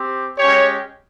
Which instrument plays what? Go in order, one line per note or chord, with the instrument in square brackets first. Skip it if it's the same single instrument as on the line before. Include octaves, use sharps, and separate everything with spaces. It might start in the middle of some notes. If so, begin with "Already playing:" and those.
Already playing: [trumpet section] C4 G4
G#3 C#4 G4 C#5